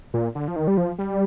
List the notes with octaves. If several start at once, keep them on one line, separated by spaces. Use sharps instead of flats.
A#2
D3
F3
D#3
G3
F3
G3